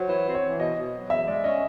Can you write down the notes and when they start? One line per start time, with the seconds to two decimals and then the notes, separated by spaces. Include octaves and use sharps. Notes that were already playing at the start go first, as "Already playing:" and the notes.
Already playing: F#3 C5 F#5
0.09 E3 C#5
0.26 C4
0.35 C#5
0.43 E3
0.60 B2 D#5
0.77 B2
0.94 F#3
1.10 E2 E5
1.27 G#3 D5
1.44 C#4 D#5